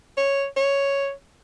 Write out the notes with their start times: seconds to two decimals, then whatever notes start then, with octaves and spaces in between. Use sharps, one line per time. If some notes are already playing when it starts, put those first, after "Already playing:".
0.18 C#5
0.56 C#5